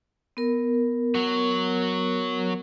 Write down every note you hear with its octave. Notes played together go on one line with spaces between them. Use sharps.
B3 A#4
F#3 F#4